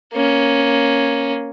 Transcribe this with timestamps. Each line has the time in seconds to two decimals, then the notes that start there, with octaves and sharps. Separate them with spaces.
0.13 A#3 C#4